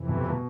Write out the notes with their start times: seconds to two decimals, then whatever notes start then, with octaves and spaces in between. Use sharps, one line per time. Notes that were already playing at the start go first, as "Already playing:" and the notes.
Already playing: F2 C3 E3
0.09 B2
0.30 B2